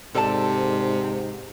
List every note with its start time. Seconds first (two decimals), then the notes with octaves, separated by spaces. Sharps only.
0.15 G#2 C3 A4 D5 A5